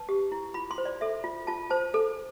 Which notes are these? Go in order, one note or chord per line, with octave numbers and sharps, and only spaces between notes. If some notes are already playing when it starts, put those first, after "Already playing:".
Already playing: B4 A5
G4
E4
F4 B5
C6
C5
D5
A4 E5
F4
F4 A5
C5 A5
A4